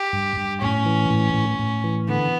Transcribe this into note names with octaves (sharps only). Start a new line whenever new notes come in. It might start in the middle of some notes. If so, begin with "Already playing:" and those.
Already playing: G4
G2
G2
A2 C#4
E3
A2
A2
A2
E3
D3 B3